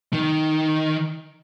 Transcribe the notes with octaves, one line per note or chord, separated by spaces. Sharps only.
D#3